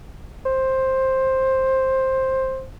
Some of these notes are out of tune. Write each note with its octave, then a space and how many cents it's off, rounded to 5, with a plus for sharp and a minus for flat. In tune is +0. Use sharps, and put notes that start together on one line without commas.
C5 +10